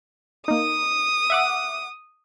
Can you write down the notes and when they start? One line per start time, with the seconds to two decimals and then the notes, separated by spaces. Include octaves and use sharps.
0.48 A#3 D#4 D#6
1.30 E5 F#5 D6